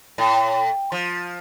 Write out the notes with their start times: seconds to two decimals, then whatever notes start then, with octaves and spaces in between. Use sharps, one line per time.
0.18 A2
0.92 F3